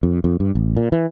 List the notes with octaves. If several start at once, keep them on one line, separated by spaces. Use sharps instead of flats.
F2
F2
G2
A1
A#2
E3